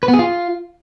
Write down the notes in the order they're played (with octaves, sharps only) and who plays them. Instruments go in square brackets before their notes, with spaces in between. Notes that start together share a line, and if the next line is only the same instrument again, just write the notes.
[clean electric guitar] B4
B3
G#4
F4